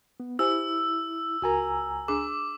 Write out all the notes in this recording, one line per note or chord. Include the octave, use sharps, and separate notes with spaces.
B3
E4 G4 C5 G#5 E6
C#2 F#4 A#4 G#5 A#5
D4 G#4 D6